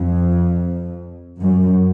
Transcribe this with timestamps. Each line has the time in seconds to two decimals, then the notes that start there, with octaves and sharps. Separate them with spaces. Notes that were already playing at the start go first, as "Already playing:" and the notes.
Already playing: F2
1.39 F#2